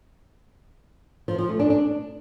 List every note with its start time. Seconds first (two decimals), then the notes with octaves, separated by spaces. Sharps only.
1.28 F3
1.39 F3
1.49 A3
1.60 D4
1.70 D4